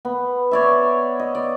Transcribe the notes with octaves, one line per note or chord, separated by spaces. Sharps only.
B3
C#5 D5 E5
D#5
D5